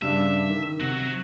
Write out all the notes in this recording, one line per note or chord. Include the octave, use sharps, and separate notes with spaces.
G2 C#3 D4 E5
D#3
C3 F#3 F#4